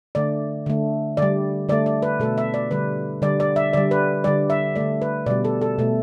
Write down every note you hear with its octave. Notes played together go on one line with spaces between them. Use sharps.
D3 A3 D5
D3 A3
D3 G3 D5
D3 A3 D5
D5
B4
B2 A3 A4
E5
D5
D3 G3 B4
D3 G3 D5
D5
E5
D3 G3 D5
B4
D3 G3 D5
E5
D3 A3 D5
B4
B2 G3 D5
A4
A4
B2 A3